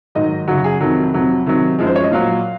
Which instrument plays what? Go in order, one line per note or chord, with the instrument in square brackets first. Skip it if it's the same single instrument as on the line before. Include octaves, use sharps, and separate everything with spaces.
[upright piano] G#2 D#3 F#3 D#5
F#2 C#3 F#3 F#4
G#4
F2 C3 D#3 F#3
F2 C3 F#3
C3 D#3 F#3
F#2 F3 G#3
C5
C#5
D#5
A#2 F#3 F5